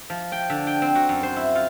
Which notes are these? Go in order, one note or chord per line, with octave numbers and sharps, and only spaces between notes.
F3
G5
D3
G5
C4
F#4
F#2
C5
E4
F4